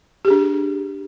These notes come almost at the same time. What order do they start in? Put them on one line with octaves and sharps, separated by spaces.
G4 G#4 D4